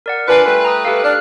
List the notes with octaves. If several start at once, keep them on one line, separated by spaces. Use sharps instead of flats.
A#4 D5 F#5
D4 F4 B4 G#5 C7
G3 A3 B4
A#5 D#6
G4 A4 F5
D4 F6 F#6